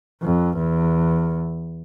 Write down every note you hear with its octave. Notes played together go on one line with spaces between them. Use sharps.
F2
E2